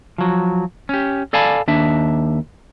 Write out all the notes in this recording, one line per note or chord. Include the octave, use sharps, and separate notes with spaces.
F3 F#3
C#4 G4
A4 D5 F5 G#5 A5 B5
D#2 D4 E5